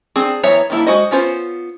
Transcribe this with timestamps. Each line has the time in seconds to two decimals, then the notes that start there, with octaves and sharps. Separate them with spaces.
0.16 C4 D4 G#4
0.43 E3 B3 C#5 E5 A#5
0.70 D#3 G3 A#3 E4 A5
0.87 G#3 F#4 C5 D#5
1.11 B3 C#4 F4 C5